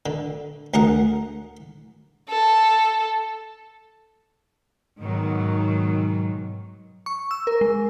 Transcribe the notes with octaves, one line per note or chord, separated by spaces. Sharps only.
D3
D2 G#4 A#4 F#5
A4
G#2 B2 D#3 F#3
C#6
E6
A#4
G#3